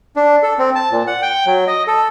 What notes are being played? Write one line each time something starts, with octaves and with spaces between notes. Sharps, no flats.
D4
A4
C4
A5
A#2
F#5
G5
F#3
D#5
A4